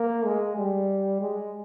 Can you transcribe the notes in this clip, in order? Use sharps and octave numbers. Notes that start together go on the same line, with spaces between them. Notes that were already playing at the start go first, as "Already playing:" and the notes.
Already playing: A#3
G#3
G3
G#3